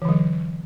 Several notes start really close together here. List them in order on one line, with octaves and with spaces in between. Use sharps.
E3 D3 F#3